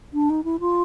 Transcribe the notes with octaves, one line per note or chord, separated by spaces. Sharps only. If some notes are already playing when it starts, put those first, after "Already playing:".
D4
D#4
E4
F4